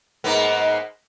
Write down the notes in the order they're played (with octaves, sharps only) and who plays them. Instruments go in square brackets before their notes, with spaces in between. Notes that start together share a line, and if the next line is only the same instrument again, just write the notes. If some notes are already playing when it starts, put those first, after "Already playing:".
[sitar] G#2 A#3 B3